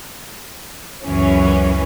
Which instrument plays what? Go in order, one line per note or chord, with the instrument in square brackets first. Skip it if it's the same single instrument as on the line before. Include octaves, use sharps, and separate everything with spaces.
[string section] C#2 F#2 E3 F#3 C#4